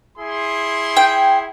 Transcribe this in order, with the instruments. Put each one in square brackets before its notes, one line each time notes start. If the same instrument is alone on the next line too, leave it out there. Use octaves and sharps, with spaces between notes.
[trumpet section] E4 G#4 C6
[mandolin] G5